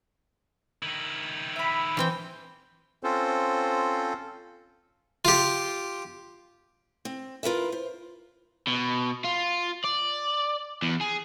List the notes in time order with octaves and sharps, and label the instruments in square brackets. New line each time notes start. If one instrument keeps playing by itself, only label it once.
[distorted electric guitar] D#3 E4
[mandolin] E5 B5
[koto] E3 C4 G5
[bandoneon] C4 C#4 F4 A4 C5
[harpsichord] F4 G4
[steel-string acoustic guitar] C4
E4 F4 A#4 B4 E5
C5
[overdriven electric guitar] B2
F4
D5
E2
G#4